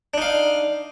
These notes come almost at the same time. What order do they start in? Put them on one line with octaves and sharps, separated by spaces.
D4 D#4 F5